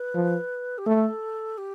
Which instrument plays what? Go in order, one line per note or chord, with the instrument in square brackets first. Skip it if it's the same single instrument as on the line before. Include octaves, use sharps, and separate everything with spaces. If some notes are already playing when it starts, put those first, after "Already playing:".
Already playing: [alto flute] B4
[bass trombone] F3
[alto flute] G4
[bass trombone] A3 [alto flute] A4
[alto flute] G4